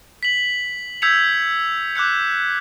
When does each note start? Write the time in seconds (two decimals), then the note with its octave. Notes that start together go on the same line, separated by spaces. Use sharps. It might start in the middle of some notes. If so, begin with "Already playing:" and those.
0.23 B6 F#7
1.02 E6 G6 G#6 B6 C#7 F7
1.95 D6 F#6 G6 C#7